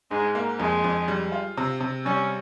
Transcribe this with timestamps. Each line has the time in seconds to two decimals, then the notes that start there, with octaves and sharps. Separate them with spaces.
0.11 G#2 G#3
0.35 A#3
0.60 F2 G#3
0.84 F2
1.08 G3
1.32 F4
1.57 C3
1.80 C3
2.05 G3 C#4